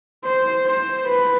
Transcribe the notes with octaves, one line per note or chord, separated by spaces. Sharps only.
C5
C5
B4